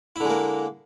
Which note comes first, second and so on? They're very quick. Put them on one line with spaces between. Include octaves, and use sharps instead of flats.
E4 D3 G#3 A#3